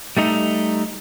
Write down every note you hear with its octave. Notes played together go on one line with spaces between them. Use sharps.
G3 A3 D#4